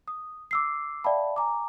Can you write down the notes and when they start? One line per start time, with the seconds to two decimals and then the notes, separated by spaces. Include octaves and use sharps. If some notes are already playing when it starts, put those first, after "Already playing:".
0.08 D#6
0.51 D6 E6 C7
1.04 D5 E5 F5 G5 A5 B5
1.36 G#5 A#5 D6